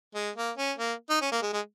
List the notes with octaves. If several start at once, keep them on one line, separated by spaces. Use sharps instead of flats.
G#3
A#3
C#4
A#3
D#4
C#4
A#3
G#3
G#3